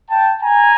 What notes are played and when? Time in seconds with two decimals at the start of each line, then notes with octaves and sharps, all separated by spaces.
0.10 G5 A5
0.42 G#5 A#5